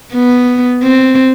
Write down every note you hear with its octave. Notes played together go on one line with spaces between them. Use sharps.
B3
C4